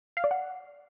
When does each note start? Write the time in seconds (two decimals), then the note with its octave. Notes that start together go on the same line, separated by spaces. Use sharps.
0.17 F5
0.24 D5
0.31 F#5